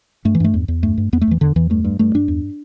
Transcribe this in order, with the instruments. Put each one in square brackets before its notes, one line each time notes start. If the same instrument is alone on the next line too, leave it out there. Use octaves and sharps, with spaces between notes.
[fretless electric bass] G2 A3
E3
G2 A3
E2
E2
G2 A3
G2
E2 B3
A3
E2 E3
E2 D3
E2 E3
G2 A3
G2
G2 A3
G2 D4
E2